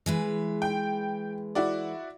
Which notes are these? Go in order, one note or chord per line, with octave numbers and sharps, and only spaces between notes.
E3 G#3 B4
G5
E4 F#4 D5